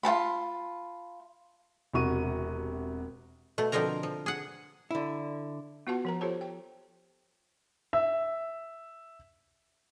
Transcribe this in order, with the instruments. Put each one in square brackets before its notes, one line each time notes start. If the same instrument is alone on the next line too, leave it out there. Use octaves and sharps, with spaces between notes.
[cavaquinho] F4 A4 A5 B5
[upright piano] E1 C3 F#4 C#6 D#7
[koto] B2 A3
B2 D3 F3 C4 A#4 A#5
F3
G#4 F#5
[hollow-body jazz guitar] D3 E4
[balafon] B3 F4 F#4 B4 F#5 A5
F3 A#4 A#5
F4 G4 A4 C5 C#5 A5
G5
[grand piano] E5 E6